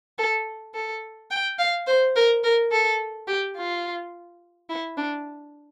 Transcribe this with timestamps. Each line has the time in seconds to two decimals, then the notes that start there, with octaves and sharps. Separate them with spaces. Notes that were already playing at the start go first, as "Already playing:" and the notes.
0.18 A4
0.74 A4
1.31 G5
1.59 F5
1.87 C5
2.16 A#4
2.44 A#4
2.71 A4
3.28 G4
3.56 F4
4.70 E4
4.98 D4